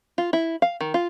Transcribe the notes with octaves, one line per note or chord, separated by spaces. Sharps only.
F4
E4
F5
D#3
F4